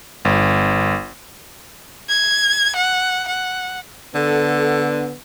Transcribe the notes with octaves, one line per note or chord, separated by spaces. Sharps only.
G1
G#6
F#5
F#5
D3 B3 A4